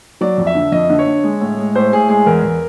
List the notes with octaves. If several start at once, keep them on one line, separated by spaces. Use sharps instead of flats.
F#3 D5
F2
E5
D3
F2 D#5
D3
C#5
D3
G#3
A2
G#3
A2 C5
A2 G#4
G#3 G#4
E2 A#4
E2